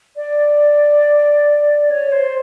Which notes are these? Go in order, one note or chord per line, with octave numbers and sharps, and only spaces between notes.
D5
C#5
C5